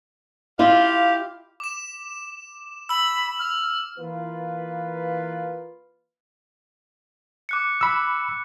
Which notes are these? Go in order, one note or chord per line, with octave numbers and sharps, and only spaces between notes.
E4 F4 G4 F5
D6 E7
B5 E6 F#7
F6
E3 A#3 F4 B4
D6 F#6 C#7
B5 E6